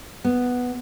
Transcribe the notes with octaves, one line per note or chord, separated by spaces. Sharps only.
B3